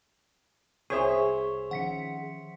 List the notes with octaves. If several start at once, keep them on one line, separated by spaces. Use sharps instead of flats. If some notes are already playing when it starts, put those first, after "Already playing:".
C2 G#4 C5 C#5 E5 C#6
D#3 F3 C#4 F#5 B6 C#7